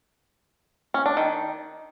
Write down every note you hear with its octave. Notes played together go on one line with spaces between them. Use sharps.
C#4
D4
D#3